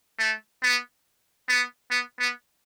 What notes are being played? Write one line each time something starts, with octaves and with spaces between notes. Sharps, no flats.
A3
B3
B3
B3
B3